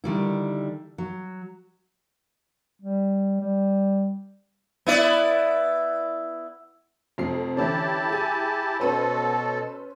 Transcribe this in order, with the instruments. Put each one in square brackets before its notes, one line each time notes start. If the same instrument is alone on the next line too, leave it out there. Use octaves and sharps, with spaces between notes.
[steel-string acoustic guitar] D3 D#3 G3 E4
F#3
[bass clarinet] G3
G3
[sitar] B3 E4 D5
[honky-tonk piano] F1 F2 C7
[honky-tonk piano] D3 E3 C#4 [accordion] E4 G4 A5
[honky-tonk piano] G#4 G#5
[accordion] B2 A4 [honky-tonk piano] C#4 B4 C5